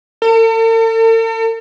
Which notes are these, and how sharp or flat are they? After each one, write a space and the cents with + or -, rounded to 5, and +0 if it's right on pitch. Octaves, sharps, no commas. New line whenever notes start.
A4 +45